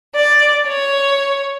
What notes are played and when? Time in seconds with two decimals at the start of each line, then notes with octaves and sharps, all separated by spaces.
0.15 D5
0.68 C#5